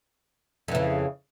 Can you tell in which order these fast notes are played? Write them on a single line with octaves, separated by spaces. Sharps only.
F2 E3 C#3